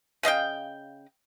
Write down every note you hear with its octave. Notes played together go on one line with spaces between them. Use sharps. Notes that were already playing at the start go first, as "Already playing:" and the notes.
C#3 D#5 F5 G5